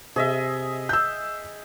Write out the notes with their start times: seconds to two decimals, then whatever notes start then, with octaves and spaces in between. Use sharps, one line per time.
0.16 C3 G#4 D#5 E5
0.89 E6 G6